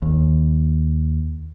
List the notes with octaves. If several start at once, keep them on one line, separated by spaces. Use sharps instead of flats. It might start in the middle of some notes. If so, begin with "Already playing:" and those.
D#2